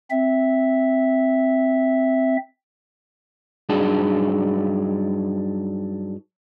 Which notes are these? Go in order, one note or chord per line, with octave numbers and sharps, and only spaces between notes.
C4 E5
G2 F#3 D4 D#4 G#4 A5